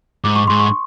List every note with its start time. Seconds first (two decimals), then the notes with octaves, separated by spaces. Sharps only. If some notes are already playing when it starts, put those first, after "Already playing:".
0.24 G#2 D6
0.36 C#6
0.47 G#2 C6
0.60 C#6